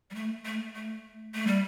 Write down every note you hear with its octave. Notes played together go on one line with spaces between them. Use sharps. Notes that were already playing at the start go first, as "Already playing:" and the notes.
G3
A3
A3
A3
A3
G3